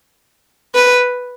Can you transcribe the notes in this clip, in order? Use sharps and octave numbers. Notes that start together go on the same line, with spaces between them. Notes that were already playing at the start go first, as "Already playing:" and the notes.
B4